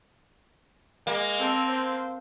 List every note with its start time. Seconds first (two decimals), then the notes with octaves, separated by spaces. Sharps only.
1.07 G#3 A#3
1.38 C4 A4
1.69 C5